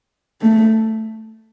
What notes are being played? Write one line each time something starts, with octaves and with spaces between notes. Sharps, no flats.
A3